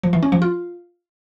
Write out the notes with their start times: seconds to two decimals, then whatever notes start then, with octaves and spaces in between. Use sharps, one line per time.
0.03 F3
0.13 E3
0.23 C#4
0.32 F3
0.42 F4